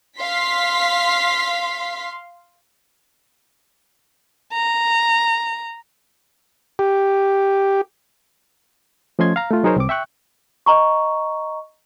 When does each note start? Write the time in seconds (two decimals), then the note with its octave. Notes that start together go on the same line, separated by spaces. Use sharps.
0.20 F5 C6 B6
4.53 A#5
6.79 G4
9.19 F3 A3 C#4 D#5 C6 G#6
9.36 F5 A#5
9.50 A3 F4
9.63 F#3 D#4 G#4 A#4 C5 C#5
9.76 C2 C4 D6
9.89 E5 G5 C#6 F#6
10.66 D#5 A#5 C#6